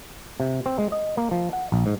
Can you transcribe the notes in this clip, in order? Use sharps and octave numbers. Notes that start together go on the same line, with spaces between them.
C3
C4
G#3
D#5
A#3
F3
F#5
A#1
G#2